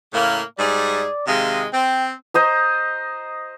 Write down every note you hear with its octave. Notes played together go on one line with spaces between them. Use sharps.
A2 C#3 A#3
G#2 G3 G#4 D5
C3 D#3 G#3 F5
C4 G5
C5 D#5 A#5